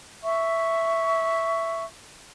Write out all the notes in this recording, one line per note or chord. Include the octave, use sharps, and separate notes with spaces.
E5 C#6